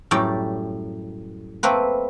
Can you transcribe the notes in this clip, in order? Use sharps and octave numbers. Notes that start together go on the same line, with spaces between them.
F#2 A2 G3 D5 G5
A3 A#3 C4 B4